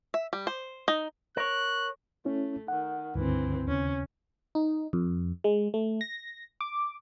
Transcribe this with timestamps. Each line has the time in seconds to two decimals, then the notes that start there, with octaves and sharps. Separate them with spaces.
0.14 E5
0.33 G3
0.47 C5
0.88 D#4
1.37 A#4 C#5 F#6
2.25 A3 C#4 E4
2.68 D#3 F#5
3.15 C#2 G2 D3 E3 C4
3.67 D#2 C#3 C#4
4.55 D#4
4.93 F2
5.44 G#3
5.74 A3
6.01 A#6
6.61 D6